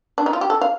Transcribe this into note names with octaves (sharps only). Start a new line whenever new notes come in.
D4
D#4
F4
G4
A4
F5